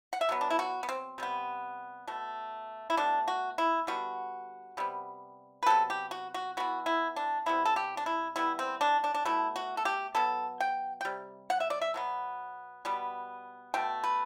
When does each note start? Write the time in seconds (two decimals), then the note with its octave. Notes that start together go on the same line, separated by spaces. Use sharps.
0.13 F#5
0.21 E5
0.29 B2 F#3 B3
0.41 D4
0.50 E4
0.59 F#4
0.83 B3
0.89 C4
1.18 C3 G3 B3
2.07 B2 A3
2.90 E4
2.97 B2 A3 D4
3.28 F#4
3.58 E4
3.87 D3 G3 B3 F#4
4.77 C3 G3 B3
5.63 B4
5.66 C3 F#3 B3 A4
5.90 G4
6.11 F#4
6.34 F#4
6.57 E3 B3 F#4
6.86 E4
7.16 D4
7.46 C3 G3 B3 E4
7.65 A4
7.76 G4
7.97 D4
8.06 E4
8.36 E3 G3 B3 E4
8.59 C4
8.81 D4
9.04 D4
9.14 D4
9.25 B2 A3 E4
9.56 F#4
9.77 A4
9.85 G4
10.15 B2 F#3 B3 A4
10.60 G5
11.01 G5
11.05 C3 G3
11.50 F#5
11.60 E5
11.70 D5
11.81 E5
11.94 B2 F#3 B3
12.85 B2 G3 B3
13.74 B2 A3 G5
14.04 B4